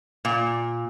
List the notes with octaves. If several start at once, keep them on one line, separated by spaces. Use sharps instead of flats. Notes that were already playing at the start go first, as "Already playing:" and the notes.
A#2